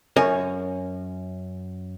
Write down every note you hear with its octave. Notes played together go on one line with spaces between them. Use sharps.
F#2 A#4 C#5 G#5